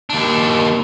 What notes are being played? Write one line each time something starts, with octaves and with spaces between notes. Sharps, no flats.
D#2 D4